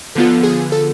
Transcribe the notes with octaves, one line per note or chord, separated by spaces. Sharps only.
D3 F3 B3 F4 A4
G#4
A4